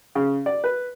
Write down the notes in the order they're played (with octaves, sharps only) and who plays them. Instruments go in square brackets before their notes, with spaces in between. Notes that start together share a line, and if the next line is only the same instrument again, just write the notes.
[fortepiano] C#3
D5
B4